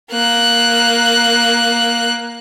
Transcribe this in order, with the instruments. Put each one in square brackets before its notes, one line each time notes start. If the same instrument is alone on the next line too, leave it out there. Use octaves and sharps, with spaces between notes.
[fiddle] A#3 F#6